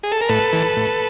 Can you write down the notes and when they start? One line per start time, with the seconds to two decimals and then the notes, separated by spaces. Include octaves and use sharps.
0.03 G#4
0.12 A4
0.21 A#4
0.29 A2 A4 B4
0.53 E3
0.76 A2